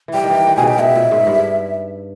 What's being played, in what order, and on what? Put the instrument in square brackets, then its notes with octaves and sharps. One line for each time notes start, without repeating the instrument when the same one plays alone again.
[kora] E3
[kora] G3 [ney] G5
[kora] D#3
E3
D#3
[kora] B2 [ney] G#5
[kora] C#3 [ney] G5
[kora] B2 [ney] E5
[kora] A#2
G#2
G2